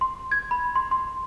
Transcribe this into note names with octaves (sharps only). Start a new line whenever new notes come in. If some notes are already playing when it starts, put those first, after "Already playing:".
C6
G#6
B5
C6
C6